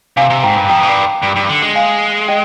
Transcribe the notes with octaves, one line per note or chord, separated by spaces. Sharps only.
C3 F5 G#5
C3
G#2 G5 A#5
G2
F2 G5 A#5
G#2
G2
G2
G2
D3
G#3
F5 G#5
D#5 G5